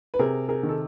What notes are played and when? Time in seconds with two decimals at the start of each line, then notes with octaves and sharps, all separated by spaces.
0.14 B4
0.19 C3 G#4 A#4
0.49 G#4 A#4
0.63 D#3
0.69 A4